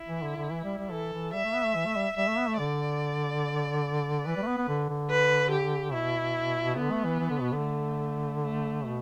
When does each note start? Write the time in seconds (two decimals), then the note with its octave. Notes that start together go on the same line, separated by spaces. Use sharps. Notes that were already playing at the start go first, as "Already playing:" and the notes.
Already playing: E4
0.08 E3
0.22 D3
0.36 D3
0.50 E3
0.64 G3
0.78 G3
0.91 E3 A4
1.13 E3
1.33 G3 E5
1.44 A3
1.54 B3
1.65 A3
1.75 E3
1.86 A3
1.96 G3
2.17 G3 E5
2.28 A3
2.38 B3
2.48 A3
2.59 D3 D5
4.25 E3 B4
4.36 G3
4.43 A3
4.47 B3
4.57 B3
4.68 D3
4.89 D3
5.10 B4
5.51 G4
5.93 B2 E4
6.77 D3 B3
6.91 A3
7.05 E3
7.19 E3
7.30 D3
7.41 B2
7.52 D3
7.60 A3
8.44 A3
8.86 B2